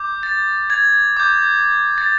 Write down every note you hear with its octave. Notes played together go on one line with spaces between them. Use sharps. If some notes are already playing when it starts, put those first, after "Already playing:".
Already playing: D6 G6
A6
G#6
D6 G6
A6